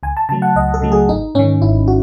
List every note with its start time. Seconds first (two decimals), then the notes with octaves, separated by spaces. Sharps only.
0.03 C#2 G#5
0.17 A5
0.29 C#3 F#3 A3 A5
0.42 F#5
0.56 C#2 D#5
0.74 A4
0.82 C#3 F#3 A3
0.92 G#4
1.09 G#1 D#4
1.35 G#2 D#3 C#4
1.62 G#1 E4
1.88 F#4